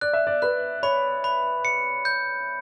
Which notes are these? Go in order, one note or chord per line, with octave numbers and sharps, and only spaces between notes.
D5 F#6
E5
D5
B4 F#6
C#5 B5
B5
C#7
G6